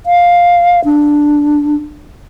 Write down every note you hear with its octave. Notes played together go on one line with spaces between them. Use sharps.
F5
D4